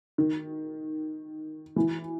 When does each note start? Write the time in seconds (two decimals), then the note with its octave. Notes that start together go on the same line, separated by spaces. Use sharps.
0.18 D#3
1.76 E3